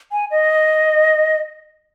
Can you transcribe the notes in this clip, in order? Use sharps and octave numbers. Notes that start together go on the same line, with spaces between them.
G#5
D#5